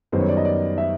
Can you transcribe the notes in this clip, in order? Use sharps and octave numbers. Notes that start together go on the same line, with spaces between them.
F#2 D#3 G3 B3 D#4 C5
C#5
D5
D#5
D5
E5